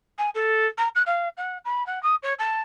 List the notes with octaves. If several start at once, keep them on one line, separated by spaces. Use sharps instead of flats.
G#5
A4
A#5
F#6
F5
F#5
B5
F#5
D#6
C#5
A5